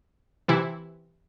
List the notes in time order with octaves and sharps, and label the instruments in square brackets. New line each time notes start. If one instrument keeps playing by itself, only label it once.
[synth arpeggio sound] C3 E3 E4